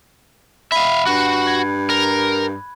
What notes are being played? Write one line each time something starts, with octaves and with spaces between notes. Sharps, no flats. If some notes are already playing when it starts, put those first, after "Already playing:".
E5 F5 B5 D#7
G2 F#4 F#6
G#6
A#4